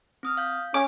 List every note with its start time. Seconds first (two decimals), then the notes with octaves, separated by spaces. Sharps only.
0.23 C4 D#6 F6
0.37 F5 G6
0.74 C#4 D6